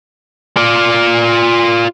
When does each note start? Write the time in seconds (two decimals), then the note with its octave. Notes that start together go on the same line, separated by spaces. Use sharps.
0.57 F4 D5